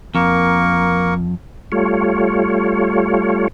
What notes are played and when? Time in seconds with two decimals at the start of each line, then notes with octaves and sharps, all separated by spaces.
0.15 F2 A#3 A#4 C#6
1.72 G3 A3 F4 C#5